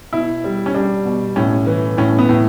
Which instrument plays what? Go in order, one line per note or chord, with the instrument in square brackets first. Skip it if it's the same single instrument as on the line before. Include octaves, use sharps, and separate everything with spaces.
[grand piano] B2 [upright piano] E4
[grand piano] G3
[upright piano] C#4
[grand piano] G3 [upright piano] D4
[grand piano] B2
[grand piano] A2 [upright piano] C#4
[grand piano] E3
[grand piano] A2 [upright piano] C#4
[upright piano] B3
[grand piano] A2